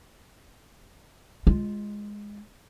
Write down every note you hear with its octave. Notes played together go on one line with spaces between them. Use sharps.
G#3 F4